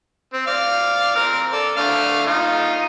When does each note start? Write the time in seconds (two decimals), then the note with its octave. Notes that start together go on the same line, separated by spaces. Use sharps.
0.33 C4
0.47 D5 F5
1.16 C4 A#4 F6
1.52 A4 D5
1.77 D3 A3 F5
2.26 D#4 F4